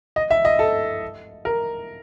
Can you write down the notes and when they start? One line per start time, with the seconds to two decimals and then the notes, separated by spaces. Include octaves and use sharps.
0.16 D#5
0.31 E5
0.45 D#5
0.59 A4
1.45 A#4